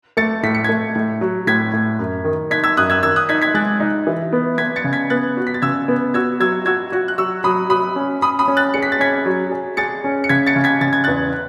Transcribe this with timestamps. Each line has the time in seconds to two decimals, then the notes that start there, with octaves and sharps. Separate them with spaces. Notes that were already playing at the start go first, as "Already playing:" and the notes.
0.17 A3 A6 C#7
0.43 A2 B6
0.55 C#7
0.64 A3 G#6 B6
0.95 A2
1.21 F#3
1.47 A2 G#6 B6
1.73 A2
1.99 F#2
2.24 D#3
2.51 D#4 G#6 B6
2.63 E6 G#6
2.77 F#2 D#6 F#6
2.90 E6 G#6
3.03 D#3 E6 G#6
3.16 D#6 F#6
3.29 D#4 G#6 B6
3.42 G#6 B6
3.54 G#3 F#6 A6
3.80 D#4
4.07 E3
4.33 B3
4.58 B3 G#6 B6
4.76 A6 C#7
4.84 C#3
4.93 G#6 B6
5.10 B3 F#6 A6
5.37 F#4
5.47 B6
5.54 A6
5.62 C#3 E6 G#6
5.88 B3
6.14 F#4 E6 G#6
6.40 F#3 E6 G#6
6.66 F#4 E6 G#6
6.92 F#4
7.08 F#6
7.18 F#3 C#6 E6
7.44 F#3 B5 D#6
7.70 F#3 B5 D#6
7.96 C#4
8.22 C#4 B5 D#6
8.39 B5 D#6
8.48 C#4
8.57 F#6 A6
8.74 G#4 C#7
8.83 B6
8.92 A6
8.99 C#4 G#6 B6
9.26 F#3
9.51 G#4
9.77 G#4 A6 C#7
10.04 C#4
10.24 C#7
10.29 C#3 G#6 B6
10.47 A6 C#7
10.56 C#3
10.64 G#6 B6
10.81 C#3 A6
10.93 G#6
11.04 E2 F#6 A6